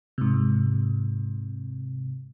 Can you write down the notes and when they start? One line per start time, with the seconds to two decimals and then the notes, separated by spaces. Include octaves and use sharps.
0.18 G#2 C3